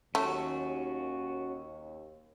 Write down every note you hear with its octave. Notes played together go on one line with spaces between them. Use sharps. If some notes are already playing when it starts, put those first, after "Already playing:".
D#2 A3 C#4 F#4